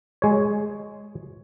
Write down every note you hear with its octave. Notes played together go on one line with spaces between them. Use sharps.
G#3 C#5